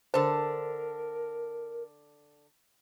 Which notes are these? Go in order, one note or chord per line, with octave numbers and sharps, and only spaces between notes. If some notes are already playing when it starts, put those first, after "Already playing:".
D3 A#4 C5 A5